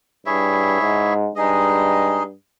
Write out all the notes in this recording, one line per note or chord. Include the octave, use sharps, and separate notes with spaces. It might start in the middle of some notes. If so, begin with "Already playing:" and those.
G2 E4 G#4 C#5 E5
G#2
G2 G#3 D#4 G#4 D#5